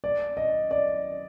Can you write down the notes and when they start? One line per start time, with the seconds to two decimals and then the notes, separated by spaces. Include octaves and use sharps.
0.04 D5
0.37 D#5
0.71 D5